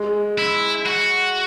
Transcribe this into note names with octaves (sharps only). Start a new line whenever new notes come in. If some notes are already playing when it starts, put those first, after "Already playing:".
Already playing: G#3
E4
F#4